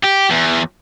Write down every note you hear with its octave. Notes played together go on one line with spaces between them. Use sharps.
G4
E2